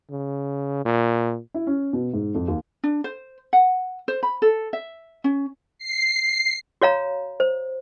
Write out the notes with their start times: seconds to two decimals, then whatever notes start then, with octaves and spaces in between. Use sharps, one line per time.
0.10 C#3
0.85 A#2
1.54 E4
1.67 C#4
1.93 B2
2.14 G#2
2.35 F2
2.48 D#2
2.84 D4
3.04 C5
3.53 F#5
4.08 C5
4.23 B5
4.42 A4
4.73 E5
5.24 C#4
5.78 C7
6.82 F#4 C#5 F5 A#5
7.40 C5